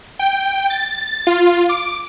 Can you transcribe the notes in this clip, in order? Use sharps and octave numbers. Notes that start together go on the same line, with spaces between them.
G5
A6
F4
D6